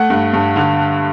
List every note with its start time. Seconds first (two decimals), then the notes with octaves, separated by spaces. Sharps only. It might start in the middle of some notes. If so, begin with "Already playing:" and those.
Already playing: A3 F#5
0.10 G2
0.33 G2
0.56 D3